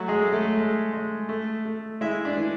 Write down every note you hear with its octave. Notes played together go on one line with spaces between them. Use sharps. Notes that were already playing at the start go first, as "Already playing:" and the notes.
Already playing: F#3 A3 F#4
G#3 G#4
A3
A3 A4
G#3
G#3
A3
A3
G#3 E4 E5
D4 D5
E3